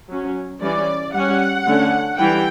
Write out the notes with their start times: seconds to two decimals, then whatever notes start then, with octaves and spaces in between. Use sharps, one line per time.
0.09 F#3 C#4
0.61 E3 G3 C#4 D5
1.14 G3 C#4 F#5
1.66 D3 A3 C#4
2.18 E3 G3 G5